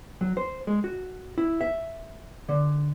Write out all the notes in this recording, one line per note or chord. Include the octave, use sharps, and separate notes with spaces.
F#3
C5
G#3
F#4
E4
E5
D3